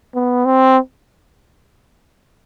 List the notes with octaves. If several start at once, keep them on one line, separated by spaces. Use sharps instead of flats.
B3
C4